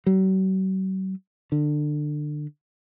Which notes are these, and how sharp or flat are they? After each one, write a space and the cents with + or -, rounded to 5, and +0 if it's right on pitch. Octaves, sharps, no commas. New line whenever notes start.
F#3 +45
D3 +25